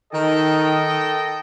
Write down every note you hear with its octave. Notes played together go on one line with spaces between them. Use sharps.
D#3 A4 D#5 G5